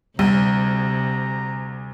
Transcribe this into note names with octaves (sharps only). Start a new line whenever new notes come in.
D2 C3 G3 A#5